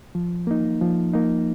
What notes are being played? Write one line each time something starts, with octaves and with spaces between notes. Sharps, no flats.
F3
A#3 D#4
F3
A#3 D#4